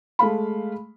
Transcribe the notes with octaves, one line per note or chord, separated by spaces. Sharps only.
G#3 A3 F5 B5